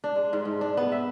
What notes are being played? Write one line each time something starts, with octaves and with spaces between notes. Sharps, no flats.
D4
G#3
G#2
G#2
D4
B3
E5